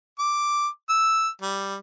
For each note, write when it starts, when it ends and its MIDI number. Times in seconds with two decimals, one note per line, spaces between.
0.19 0.67 86
0.90 1.29 88
1.42 1.76 55